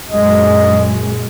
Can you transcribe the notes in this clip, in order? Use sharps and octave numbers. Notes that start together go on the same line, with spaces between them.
F#2 A#2 G#3 D#5